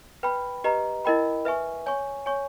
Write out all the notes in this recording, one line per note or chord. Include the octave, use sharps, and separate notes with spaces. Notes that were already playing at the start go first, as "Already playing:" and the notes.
B4 G5 B5
G4 B4 D#5 A#5
E4 A#4 D#5 G5 B5
B4 E5 G#5 C#6
C#5 G#5 C#6
C#5 G#5 C#6